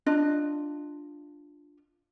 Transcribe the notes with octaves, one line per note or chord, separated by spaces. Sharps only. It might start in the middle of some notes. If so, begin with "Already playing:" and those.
D4 F4 D#5